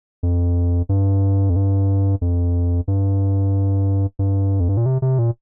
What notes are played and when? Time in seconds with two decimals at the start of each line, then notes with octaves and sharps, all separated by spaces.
0.23 F2
0.89 G2
1.50 F2
1.56 G2
2.21 F2
2.88 G2
4.19 G2
4.60 F2
4.69 G2
4.77 A#2
4.86 C3
5.02 C3
5.19 A#2